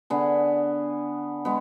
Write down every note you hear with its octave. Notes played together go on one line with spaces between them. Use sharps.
D3 B3 G#4
G#3 B3